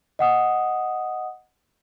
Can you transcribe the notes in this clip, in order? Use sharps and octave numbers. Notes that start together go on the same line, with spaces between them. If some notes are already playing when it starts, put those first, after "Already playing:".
D#5 F#5 D#6